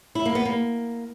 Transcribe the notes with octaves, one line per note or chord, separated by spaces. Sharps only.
E4
A#3
B3
A#3